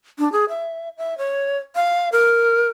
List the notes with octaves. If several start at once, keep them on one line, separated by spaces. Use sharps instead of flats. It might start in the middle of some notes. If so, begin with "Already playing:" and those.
D4
G#4
E5
E5
C#5
F5
A#4